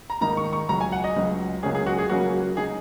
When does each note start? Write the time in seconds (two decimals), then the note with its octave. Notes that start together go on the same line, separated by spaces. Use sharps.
0.10 A#5
0.21 G#2 D#3 A#3 D#4 A#5
0.37 C#6
0.53 C#6
0.69 C#2 C#3 F#3 A#5
0.81 G#5
0.92 F#5
1.04 D#5
1.16 C#2 C#3 F#3
1.63 C#2 C#3 F#3 A#3 C#4 G#4
1.75 G#4
1.87 F#4
1.98 G#4
2.10 C#2 C#3 F#3 A#3 C#4 F#4
2.57 C#3 G#3 D#4 G#4